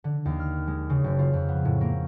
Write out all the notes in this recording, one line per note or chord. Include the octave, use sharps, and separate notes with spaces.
D3
D#2
F6
G#3
C#3
F#1
F4
F2
B3
A2
A#3